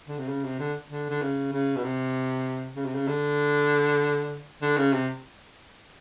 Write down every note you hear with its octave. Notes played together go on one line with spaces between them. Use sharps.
D3
C3
C#3
C3
D3
D3
D3
C#3
C#3
B2
C3
C#3
C3
C#3
D3
D3
C#3
C3